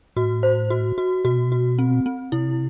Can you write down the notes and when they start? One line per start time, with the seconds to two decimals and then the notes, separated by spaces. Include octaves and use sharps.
0.16 A2 F#4
0.43 C5
0.70 F#4
0.98 F#4
1.25 B2 F#4
1.52 F#4
1.79 C4
2.06 C4
2.32 C3 E4